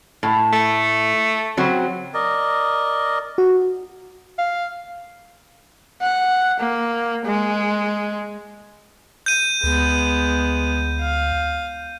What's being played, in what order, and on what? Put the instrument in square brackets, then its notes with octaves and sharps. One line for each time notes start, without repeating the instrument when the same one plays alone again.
[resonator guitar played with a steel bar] A2
[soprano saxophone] A3
[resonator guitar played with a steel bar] C#3 F#3 C4
[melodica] A#4 D5 D#5
[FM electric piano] F#4
[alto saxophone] F5
[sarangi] F#5
A#3
G#3
[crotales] G6 D#7
[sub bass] D2 [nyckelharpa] G#3 B3
[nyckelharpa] F5